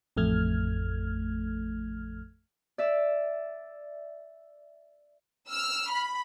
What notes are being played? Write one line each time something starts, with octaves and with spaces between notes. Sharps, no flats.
A1 F2 A3 F6 G#6
D5 E5
E6 F6
B5